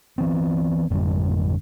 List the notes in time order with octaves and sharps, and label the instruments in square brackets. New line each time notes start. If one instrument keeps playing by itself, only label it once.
[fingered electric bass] E3 B3 C4
G#1 F2 D3 G3